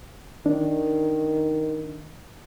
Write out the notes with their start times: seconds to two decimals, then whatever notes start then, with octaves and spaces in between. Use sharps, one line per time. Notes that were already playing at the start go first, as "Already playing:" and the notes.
0.46 D#3 D4